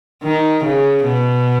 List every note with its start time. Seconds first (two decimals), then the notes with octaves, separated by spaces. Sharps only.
0.24 D#3
0.64 C#3
1.04 B2